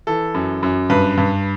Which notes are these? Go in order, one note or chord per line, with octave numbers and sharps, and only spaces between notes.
E3 A4
F#2
F#2
G2 B4
G2